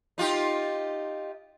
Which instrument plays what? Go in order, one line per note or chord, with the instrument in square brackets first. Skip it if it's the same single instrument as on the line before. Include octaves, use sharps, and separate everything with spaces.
[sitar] D#4 F4 G4